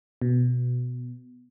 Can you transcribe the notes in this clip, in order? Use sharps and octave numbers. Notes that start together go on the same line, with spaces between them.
B2